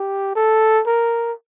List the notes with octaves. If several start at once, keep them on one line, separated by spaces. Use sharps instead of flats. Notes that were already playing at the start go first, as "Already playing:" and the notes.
Already playing: G4
A4
A#4